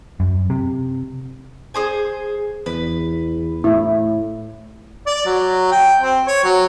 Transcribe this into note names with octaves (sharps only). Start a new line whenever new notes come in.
F#2
C3
G#4 C5 G#5
E2 B4
A2 E4
D5
F#3
G5
C4
C#5
F#3